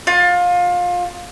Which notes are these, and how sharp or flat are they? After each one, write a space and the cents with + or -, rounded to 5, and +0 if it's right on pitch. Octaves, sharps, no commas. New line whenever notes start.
F4 +25